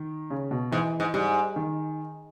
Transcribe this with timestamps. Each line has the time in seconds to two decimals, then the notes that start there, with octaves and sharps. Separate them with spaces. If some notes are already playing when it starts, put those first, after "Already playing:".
Already playing: D#3
0.30 C#3
0.51 B2
0.72 G#2 E3
1.00 G#2
1.14 G#2 G3
1.56 D#3